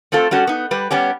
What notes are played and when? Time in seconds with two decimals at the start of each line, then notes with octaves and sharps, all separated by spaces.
0.12 A3 C4 F4 A4
0.31 G3 C#4 F#4 A4
0.47 B3 D#4
0.71 G3 B4
0.91 G3 B3 C#4 G4